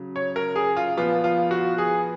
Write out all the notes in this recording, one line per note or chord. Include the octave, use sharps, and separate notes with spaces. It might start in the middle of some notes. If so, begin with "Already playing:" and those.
Already playing: C#3 F#3
C#5
A#4
G#4
F4
A#2 F3 B3 F4
F4
F#4
G#4